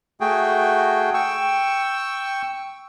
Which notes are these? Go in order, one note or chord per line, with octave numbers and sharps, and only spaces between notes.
A3 F#4 G#4 G5
G5 C#6 E6